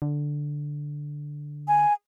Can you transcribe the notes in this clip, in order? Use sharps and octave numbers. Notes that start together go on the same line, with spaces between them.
D3
G#5